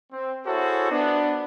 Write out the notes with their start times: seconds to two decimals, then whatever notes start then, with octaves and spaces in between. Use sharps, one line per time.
0.12 C4
0.46 E4 F#4 G#4 A4 C5 C#5
0.91 B3 D4